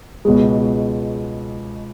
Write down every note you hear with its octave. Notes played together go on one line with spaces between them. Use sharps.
C#2 B2 G#3